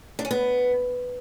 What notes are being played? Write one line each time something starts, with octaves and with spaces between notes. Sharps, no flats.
D4
C#4
B3